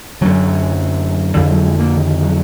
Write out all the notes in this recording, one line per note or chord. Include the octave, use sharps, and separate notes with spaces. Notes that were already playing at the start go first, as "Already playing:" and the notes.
F#2 D3 F#3
F2 D3 F3
F#3
G#3
A#3
D#3
F#3